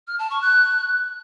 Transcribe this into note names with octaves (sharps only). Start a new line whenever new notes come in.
F6
A5
C#6
F#6